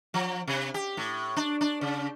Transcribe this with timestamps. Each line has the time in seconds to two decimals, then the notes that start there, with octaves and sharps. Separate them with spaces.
0.14 F3
0.47 C3
0.74 G4
0.97 A2
1.36 D4
1.61 D4
1.81 C#3